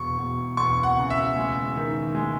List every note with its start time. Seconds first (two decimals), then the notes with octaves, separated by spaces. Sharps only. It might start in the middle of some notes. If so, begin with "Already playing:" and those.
Already playing: E1 C#6
0.18 E1
0.57 E1 C#6
0.83 F#5
0.97 C#3
1.10 E5
1.36 G#3
1.76 D#3
2.15 G#3